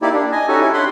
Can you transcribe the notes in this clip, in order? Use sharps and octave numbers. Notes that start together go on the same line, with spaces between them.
A#3 D#4 E4 G4 D5
D4
D#5 G#5
C#4 D#4 F#4 G4 A4
C#4 E4
D4 G4 D5 F#5 B5 C6